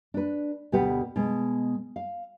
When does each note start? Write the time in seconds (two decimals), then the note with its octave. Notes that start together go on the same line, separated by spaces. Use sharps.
0.14 D4 B4
0.72 D2 B2 G4 B4 F#5
1.16 B2 G#3
1.96 F5